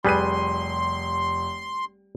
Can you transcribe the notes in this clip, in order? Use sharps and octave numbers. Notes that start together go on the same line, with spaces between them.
F1 G3 G#4 B4 C6 D#7